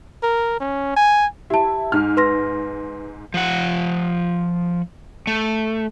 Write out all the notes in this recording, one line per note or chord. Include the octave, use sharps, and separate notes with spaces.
A#4
C#4
G#5
E4 G4 A5
G#2 F6
B4 C6 A#6
F3 F#5
A3